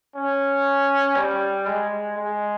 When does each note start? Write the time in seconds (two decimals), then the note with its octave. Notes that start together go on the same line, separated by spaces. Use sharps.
0.16 C#4
1.16 G3
1.66 G#3
2.17 G#3